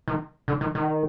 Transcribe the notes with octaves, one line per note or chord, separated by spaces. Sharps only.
D#3
D3
D#3
D#3